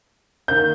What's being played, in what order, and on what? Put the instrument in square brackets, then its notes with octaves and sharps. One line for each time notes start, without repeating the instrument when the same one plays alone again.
[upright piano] D#3 A#3 G6